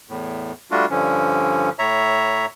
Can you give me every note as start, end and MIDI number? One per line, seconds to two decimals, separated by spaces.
0.09 0.52 40
0.09 0.52 45
0.71 0.86 55
0.71 0.86 57
0.71 0.86 62
0.71 0.86 65
0.71 0.86 66
0.90 1.70 43
0.90 1.70 50
0.90 1.70 53
0.90 1.70 61
1.79 2.46 45
1.79 2.46 73
1.79 2.46 76
1.79 2.46 82